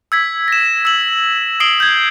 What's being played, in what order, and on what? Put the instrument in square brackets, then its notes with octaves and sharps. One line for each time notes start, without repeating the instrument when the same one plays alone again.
[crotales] E6 G#6 B6
A#6 E7
E6 F#7
D#6 C7 D7 F#7 G7
G6 G#6